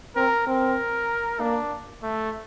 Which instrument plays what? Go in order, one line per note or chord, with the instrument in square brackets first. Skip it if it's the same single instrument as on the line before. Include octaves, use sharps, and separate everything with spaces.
[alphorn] C4 [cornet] A#4
[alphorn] C4 [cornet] A#4
[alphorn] A#3 [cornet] D4
[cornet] A3